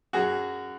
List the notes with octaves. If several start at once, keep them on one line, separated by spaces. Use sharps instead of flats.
F#2 F#4 G#4